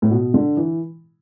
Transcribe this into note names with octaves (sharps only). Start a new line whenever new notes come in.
A2
B2
D3
E3